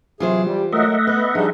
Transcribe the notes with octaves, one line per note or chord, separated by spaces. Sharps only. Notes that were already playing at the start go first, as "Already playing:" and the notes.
C3 E3 F#3 F4 G#4 C5
G3 G4
F#3 G#3 A3 A#4 D#5 E5 F#5
B3 B4
F3 G3 D4 D#4 G#4